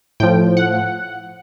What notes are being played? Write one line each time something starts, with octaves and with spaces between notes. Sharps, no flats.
A2 F3 G5
F#5